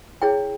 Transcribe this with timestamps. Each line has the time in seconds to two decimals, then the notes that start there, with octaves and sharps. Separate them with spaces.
0.22 E4 G#4 C#5 G5